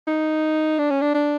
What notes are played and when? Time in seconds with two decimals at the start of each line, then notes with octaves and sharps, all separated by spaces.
0.07 D#4
0.79 D4
0.90 C#4
1.01 D4
1.15 D4